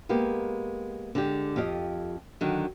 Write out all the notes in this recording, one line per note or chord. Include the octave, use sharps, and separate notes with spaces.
G#3 A#3 B3 G4
D3 G#3 G4
F2 F4 G4 D#5
D3 D#3 F#3